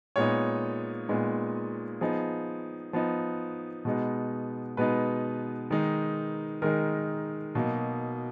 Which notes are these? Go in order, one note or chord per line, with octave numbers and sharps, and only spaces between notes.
A#2 G#3 B3 D#4 C#5
A#2 G#3 B3 D#4
F3 B3 D#4 G#4
F3 B3 D#4
B2 G#3 B3 D#4
B2 G#3 B3 D#4 B4
D#3 G#3 D#4
D#3 G#3 D#4 A#4
B2 F#3 A#3 D#4